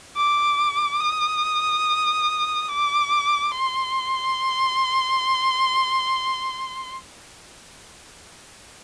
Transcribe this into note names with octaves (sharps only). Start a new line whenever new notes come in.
D6
D#6
D6
C6